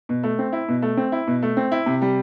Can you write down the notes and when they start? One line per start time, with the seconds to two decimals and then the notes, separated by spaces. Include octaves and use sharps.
0.09 B2
0.23 A3
0.39 C4
0.53 E4
0.68 B2
0.82 A3
0.97 C4
1.12 E4
1.27 B2
1.43 A3
1.57 C4
1.72 E4
1.86 C3
2.02 G3